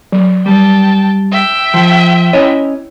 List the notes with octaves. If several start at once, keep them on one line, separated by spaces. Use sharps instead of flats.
F#3
G3 G5 A5
E5 G5
F3
C#4 E4 C#5 D#5